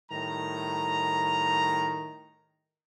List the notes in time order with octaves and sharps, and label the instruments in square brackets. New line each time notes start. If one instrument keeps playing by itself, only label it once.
[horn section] A2 D#3 G3 A#5